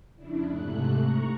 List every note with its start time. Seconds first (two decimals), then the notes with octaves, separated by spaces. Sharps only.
0.16 F2 C#3 D4 E4
0.46 G#2 C3 A3 F#6
0.97 A#5 C#6